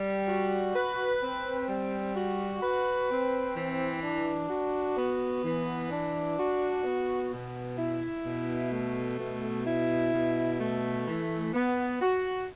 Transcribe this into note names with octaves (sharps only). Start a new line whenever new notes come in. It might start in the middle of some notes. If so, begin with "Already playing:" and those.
Already playing: G3
F#4
B4
C4
G3
F#4
B4
C4
E3
D4
F#4
B3
E3
D4
F#4
B3
B2
E4
B2
A3
B2
E4
B2
A3
E3
B3
F#4